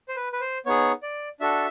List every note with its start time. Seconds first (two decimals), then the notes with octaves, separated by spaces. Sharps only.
0.08 C5
0.16 B4
0.33 B4
0.41 C5
0.66 B3 D#4 G#4 C#5
1.03 D5
1.40 D4 F#4 A4 E5